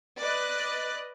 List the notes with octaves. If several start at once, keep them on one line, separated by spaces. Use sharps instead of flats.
B4 D5 D#5 F#6